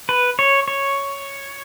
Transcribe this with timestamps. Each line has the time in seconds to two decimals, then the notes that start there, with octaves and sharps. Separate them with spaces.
0.09 B4
0.39 C#5
0.68 C#5